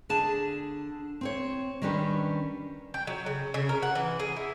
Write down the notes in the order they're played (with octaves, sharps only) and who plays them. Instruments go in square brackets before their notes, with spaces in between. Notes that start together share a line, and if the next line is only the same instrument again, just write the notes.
[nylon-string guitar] D3 D4 G#4 A5
C4 C5 C#5
D#3 G3 C#4 D4 G4 B4
[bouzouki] G5
F#3
C#3
C#3
A#4
F#5
E3
G#4
E4